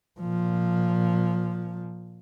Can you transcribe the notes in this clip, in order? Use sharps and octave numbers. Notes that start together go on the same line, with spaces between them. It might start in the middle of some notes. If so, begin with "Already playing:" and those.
A#2 F3